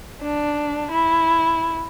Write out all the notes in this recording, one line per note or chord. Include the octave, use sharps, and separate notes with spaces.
D4
E4